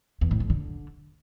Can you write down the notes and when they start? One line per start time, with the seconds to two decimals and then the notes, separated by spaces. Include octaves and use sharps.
0.21 E2
0.31 A2
0.40 F2
0.50 D3